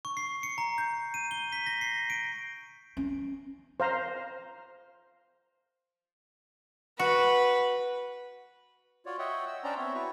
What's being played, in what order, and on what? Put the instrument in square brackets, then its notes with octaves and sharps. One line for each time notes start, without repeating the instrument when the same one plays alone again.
[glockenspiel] C#6
C7
C#7
A#5
G6
D#7
G7
B6
A#6
C7
D7
[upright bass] C#4
[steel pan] C5 F5 A#5
[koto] F#4 [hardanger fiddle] B4
[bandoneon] F4 F#4 C#5 D5
C#5 D#5 E5 F#5 G5
E6
C#4 D4 C5 D5 G5 A#5
B3 C4 C#5 E5
E4 F#4 B4 C#6